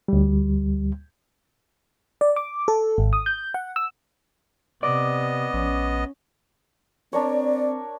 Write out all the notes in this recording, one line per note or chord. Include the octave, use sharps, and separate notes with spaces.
D2 G3
D5
D6
A4
G#1
D#6
G6
F#5
E6
C3 B3 D5 D#5
A#1 C#4
C4 D4 A#4 C#5 D5